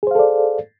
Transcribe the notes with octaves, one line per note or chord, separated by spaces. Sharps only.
G#4 A4 C5 D5 F5